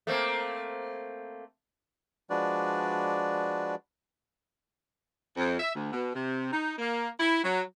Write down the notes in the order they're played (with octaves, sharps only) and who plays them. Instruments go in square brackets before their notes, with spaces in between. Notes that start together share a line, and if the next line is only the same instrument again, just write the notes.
[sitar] A3 A#3 C4
[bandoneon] F3 G#3 D4 F#4 B4 D5
[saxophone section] F2
E5
D2
B2
C3
D#4
A#3
E4
F#3